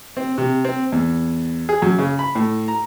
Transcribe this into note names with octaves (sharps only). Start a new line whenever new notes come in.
C4
C3
C4
E2
G#4
F#2
C#3
B5
A2
A#5